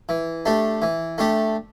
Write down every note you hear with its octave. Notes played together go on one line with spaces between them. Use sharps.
E3
A3 D4 G4
E3
A3 D4 G4